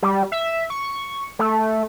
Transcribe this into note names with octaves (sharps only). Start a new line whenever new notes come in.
G3
E5
C#6
A3